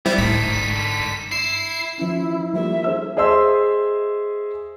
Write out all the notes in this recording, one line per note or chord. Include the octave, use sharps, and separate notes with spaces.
G3 B3 C4 E4
D1 A2 D3 D#4 B6
G#1
G2
E4 C7
F3 C#4 E4
F3 G3 A#3 E5
G#4 C5 E6
G#4 C5 D#5 E5 C6 E6